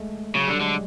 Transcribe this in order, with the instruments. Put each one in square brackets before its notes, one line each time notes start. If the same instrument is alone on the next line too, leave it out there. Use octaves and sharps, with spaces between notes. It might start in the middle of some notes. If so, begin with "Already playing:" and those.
Already playing: [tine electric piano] G#3 A3
[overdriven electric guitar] C#3 [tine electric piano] F#3
[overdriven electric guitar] D3 [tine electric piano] G3
[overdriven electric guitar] D3 [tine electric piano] G#3